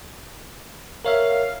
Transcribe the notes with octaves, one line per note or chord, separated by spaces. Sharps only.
A#4 C#5 E5 F5